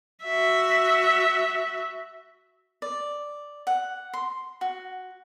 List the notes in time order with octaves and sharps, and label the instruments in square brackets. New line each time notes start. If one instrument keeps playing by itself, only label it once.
[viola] F#4 E5
[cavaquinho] D5
F#5
C6
F#4